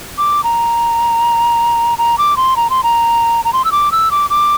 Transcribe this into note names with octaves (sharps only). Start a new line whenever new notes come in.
D6
A#5
A#5
D6
C6
A#5
C6
A#5
A#5
C6
E6
D6
E6
D6
D6